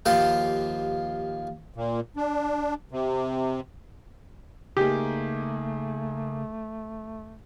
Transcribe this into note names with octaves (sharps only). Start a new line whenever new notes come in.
D#2 F3 G4 F5 G5
A#2
D4
C3
C#3 A3 A#3 D#4 G4 G#4